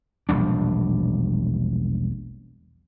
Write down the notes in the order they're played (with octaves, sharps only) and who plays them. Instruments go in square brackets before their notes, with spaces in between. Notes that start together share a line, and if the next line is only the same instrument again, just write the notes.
[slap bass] E1 A#1 G3 D4